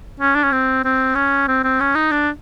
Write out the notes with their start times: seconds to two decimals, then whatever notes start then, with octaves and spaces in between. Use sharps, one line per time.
0.20 C#4
0.35 D4
0.43 C#4
0.52 C4
0.84 C4
1.15 C#4
1.48 C4
1.63 C4
1.80 C#4
1.95 D#4
2.11 D4